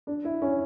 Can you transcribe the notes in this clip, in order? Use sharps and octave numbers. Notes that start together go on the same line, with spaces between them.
D4
E4
C#4